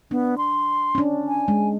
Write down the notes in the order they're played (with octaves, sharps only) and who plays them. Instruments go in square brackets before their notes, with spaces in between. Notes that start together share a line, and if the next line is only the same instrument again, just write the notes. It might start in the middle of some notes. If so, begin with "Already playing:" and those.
[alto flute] B3 [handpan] D4
[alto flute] C6
[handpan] C#4 D4
[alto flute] G#5
[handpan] G#3